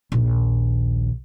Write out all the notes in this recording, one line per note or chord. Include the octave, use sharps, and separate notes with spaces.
A#1 D#2